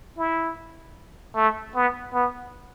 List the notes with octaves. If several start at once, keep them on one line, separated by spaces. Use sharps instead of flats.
E4
A3
B3
B3